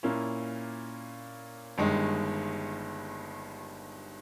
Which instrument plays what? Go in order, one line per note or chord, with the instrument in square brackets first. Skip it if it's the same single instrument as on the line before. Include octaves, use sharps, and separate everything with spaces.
[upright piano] A#2 A#3 C#4 E4
G1 G2 D#3 G#3